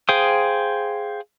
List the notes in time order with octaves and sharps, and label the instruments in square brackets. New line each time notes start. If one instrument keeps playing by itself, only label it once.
[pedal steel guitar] G#4 C5 F5 G5 D#6